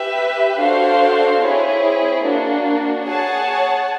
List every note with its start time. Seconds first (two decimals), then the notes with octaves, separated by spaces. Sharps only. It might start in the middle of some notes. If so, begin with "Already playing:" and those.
Already playing: G4 B4 E5
0.58 D4 F#4 A4 C5 F5
1.40 C4 E4 G#4 C#5
2.23 A#3 D4 F#4
3.05 G#4 C#5 F#5 A5